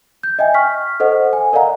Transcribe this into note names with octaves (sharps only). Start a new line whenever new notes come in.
G6
D#5 E5 G5 G#5
C#6 F6 B6
A4 C5 D#5 F#5
G#5
A#4 D5 D#5 F5 F#5 A#5